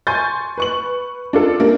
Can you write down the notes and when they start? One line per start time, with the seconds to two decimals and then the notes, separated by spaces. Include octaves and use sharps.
0.07 G#5 C6 C#6 G6 A6
0.58 B4 C#6 F#7
1.33 D4 F4 A4
1.60 A#3 D4 G4